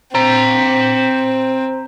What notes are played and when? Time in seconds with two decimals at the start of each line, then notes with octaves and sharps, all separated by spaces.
0.15 C4 C5 A#5